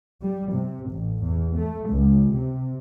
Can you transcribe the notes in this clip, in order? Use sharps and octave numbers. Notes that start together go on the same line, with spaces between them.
G3
C3
A1
E2
A3
C#2
C3